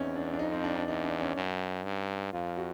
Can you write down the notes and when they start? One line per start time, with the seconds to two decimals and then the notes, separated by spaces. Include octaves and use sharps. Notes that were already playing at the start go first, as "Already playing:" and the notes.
Already playing: E2 C4 C#4 D#4 E4
0.16 D4
0.34 D4
0.39 F2 D#4
0.52 C4
0.64 D4
0.76 D4
0.87 E2 D#4
1.04 D4
1.20 C#4
1.36 F#2
1.84 G2
2.33 F2 F4
2.57 F#4